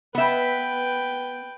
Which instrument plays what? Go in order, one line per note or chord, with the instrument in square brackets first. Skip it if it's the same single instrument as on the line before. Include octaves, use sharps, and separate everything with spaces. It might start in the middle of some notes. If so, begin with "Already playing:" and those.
[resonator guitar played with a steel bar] B3 E5 [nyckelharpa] B4 G5